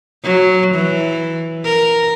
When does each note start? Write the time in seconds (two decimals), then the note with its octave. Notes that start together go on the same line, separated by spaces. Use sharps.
0.24 F#3
0.75 E3
1.64 A#4